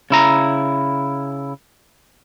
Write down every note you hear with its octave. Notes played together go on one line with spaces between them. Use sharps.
C#3 E4 A#5